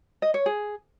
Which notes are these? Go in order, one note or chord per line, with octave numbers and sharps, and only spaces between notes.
D#5
C#5
G#4